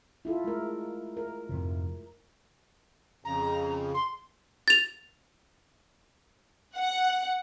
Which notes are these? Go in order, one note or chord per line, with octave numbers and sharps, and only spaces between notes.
E4 F4 A4
G#3 A3 A#4
A#4
F2 G#2 C3
F2 C#3 A#5
C6
A6 F7
F#5